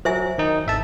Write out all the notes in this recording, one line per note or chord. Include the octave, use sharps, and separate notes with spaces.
F#3 C5 E5 G#5
D#3 D#4
G#1 E5 A5